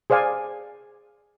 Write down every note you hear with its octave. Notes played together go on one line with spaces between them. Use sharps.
G#4 C5 D5 F5 G#5